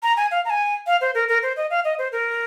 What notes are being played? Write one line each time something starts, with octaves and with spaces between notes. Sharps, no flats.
A#5
G#5
F5
A#5
G#5
F5
C5
A#4
A#4
C5
D#5
F5
D#5
C5
A#4